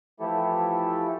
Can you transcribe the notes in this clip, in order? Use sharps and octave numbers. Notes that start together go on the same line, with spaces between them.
E3 F3 A3 E4 G4 A4